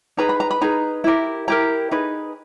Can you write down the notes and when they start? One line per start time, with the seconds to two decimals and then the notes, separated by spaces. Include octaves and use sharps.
0.17 D#4 G#4 B4 A#5
0.29 B5
0.40 A#5
0.51 B5
0.61 D#4 G#4 B4 A#5
1.04 E4 G4 A#4
1.48 E4 G4 A#4 A#5
1.91 D#4 G#4 B4